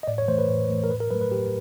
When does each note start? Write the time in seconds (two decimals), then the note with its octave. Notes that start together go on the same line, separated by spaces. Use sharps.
0.03 D#5
0.08 A2 D5
0.18 C#5
0.28 E3 A3 C5
0.38 B4
0.49 A2
0.70 E3 A3
0.84 A#4
0.90 A2 B4
1.00 A#4
1.11 F#3 A3 B4
1.21 B4
1.31 A2 G4